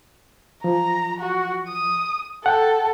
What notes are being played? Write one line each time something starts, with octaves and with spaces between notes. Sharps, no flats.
F3 A#5
F#4
D#6
A4 F#5 G5 A5